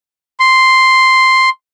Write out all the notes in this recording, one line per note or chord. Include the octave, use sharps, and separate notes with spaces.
C6